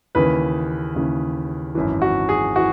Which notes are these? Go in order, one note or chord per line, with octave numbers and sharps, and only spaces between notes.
D#2 C#3 E3 B4
D#2 C#3 E3
G#1 F#2 E3
F#4
G#4
E3 F#4